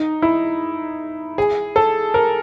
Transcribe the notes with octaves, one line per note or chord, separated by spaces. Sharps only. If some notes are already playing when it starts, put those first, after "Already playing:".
Already playing: D#4
E4
G#4
A4
A#4